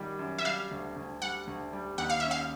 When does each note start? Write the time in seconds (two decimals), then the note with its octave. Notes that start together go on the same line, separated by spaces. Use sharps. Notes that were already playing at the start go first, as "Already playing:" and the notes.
Already playing: F#2 D#3 G3
0.19 F#2
0.38 E5
0.45 G3 F5
0.71 D2
0.96 D2
1.22 G3 F#5
1.47 D2
1.73 G3
1.98 D#2 F#5
2.10 F5
2.20 C#4 E5
2.31 F5